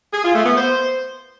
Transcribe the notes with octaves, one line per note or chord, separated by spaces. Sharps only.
G#4
F4
A3
B3
C5